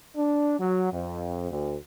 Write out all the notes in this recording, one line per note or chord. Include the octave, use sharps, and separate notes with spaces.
D4
F#3
F2
D2